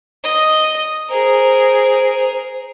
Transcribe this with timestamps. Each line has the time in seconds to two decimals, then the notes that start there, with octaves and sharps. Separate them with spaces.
0.24 D#5
1.10 G#4 A#4 C5